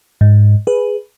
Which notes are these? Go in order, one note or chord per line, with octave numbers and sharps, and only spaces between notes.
G#2
G#4 B4